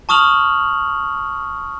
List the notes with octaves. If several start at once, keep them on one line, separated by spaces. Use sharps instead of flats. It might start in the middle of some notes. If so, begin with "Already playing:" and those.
A5 C#6 D#6 F6 F7 F#7